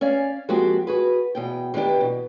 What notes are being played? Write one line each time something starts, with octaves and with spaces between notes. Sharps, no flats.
C#4 D5 F5 G#5
F3 G#3 A#3 C4 F#4 G4
F#4 G#4 B4
E2 B2 G5
D#3 E3 B3 D4 G4
B2